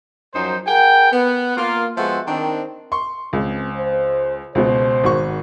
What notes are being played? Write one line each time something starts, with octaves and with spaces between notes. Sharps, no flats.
F#2 F3 F#3 D#4 C5
G#4 A#4 F#5 G5
B3
A#3 F4
F3 G#3 B3 F#4 A4 E5
D#3 C4 D4
C6 C#6
C#2 C4
C5
C#2 B2 C5
G#1 F#4 C#6